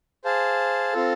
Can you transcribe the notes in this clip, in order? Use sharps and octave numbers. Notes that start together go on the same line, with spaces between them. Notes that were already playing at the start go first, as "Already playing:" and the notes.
G#4 C5 F5 A5
C4 F4 A4